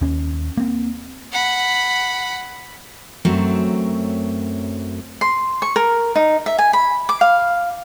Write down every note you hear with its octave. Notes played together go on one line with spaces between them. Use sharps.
D#2 C#4
A#3 C4
F#5 B5
F#2 F#3 A3 C4
C6
C#6
A#4
D#4
E5
G#5
B5
D6
F5